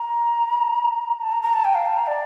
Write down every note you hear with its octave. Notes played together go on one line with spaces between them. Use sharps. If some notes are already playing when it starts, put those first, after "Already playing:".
Already playing: A#5
A5
A#5
A#5
A5
G5
F5
A5
A#5
D5